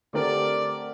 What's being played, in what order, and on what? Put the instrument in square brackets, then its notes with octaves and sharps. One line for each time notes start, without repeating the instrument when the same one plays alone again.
[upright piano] D3 A3 C4 G4 A#4 [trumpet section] D5